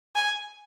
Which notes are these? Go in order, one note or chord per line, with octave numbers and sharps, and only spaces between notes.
G#5